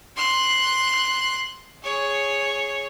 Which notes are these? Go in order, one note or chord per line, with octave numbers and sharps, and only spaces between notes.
C6 F#6
G#4 C#5